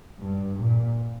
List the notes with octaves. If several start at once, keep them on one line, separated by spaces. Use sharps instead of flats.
G2
A#2